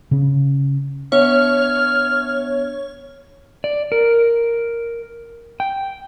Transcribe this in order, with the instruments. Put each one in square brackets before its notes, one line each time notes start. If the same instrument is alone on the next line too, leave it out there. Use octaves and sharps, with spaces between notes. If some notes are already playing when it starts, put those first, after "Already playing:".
[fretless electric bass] C#3 C#4
[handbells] B3 D4 E5 [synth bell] C#5 [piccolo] F6
[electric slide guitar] D5
A#4
G5